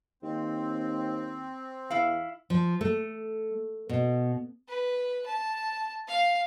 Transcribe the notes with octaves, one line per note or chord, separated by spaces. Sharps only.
D#2 C4
E2 E4 F5
F3
A3
B2
B4
A5
F5